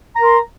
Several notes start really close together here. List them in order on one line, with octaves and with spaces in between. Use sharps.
A#5 A#4 C6